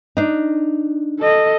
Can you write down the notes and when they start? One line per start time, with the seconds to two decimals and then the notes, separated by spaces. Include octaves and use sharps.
0.17 D4 D#4
1.21 A4 D#5